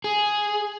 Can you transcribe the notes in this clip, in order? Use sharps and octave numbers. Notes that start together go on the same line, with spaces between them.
G#4